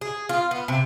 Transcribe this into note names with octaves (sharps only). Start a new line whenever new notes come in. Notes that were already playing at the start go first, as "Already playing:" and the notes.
G#4
F4
B3
C3